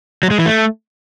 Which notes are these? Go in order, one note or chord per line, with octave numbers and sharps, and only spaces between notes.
F#3
G#3
E3
A3